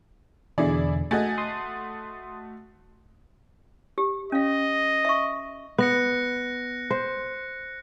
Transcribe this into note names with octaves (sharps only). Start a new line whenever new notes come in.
E2 B2 D3 E4 G#4 D5
A3 F#4 D#5 G#5
C6 D#6
G4
C#4 D#5 F5
E5 C#6
B3 F#6 A#6 C#7
C5